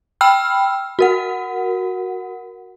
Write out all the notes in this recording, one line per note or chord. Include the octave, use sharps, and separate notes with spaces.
G5 B5 E6 F6
F#4 A#4 F#5